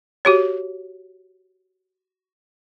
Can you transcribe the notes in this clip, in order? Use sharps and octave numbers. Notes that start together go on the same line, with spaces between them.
F#4 G4 C#5